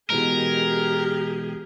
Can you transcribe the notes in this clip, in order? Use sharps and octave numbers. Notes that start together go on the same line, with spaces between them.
B2 E3 G#3 G4 G#4 A#4